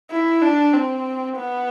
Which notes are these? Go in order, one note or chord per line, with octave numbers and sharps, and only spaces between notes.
E4
D4
C4
B3